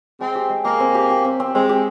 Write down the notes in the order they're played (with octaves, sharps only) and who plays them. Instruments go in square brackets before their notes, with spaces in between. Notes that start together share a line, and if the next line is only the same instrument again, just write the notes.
[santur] G#3 [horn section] C4
[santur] G4
G#3
[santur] G#3 [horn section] A#3
[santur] C4
G4
G4
C4
C4
[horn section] G#3 [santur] C4
[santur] G4